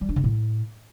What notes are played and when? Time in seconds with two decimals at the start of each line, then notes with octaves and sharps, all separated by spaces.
0.01 G3
0.09 D4
0.16 C#3
0.24 A2